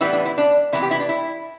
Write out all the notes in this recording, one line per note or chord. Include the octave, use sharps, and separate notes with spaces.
A2 E3 G3 B3 E4
D4
E4
D4
C3 E3 B3 E4
G4
E4
D4
E4